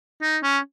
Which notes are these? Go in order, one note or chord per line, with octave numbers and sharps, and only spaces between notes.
D#4
C#4